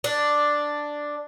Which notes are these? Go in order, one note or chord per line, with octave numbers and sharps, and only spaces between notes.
D4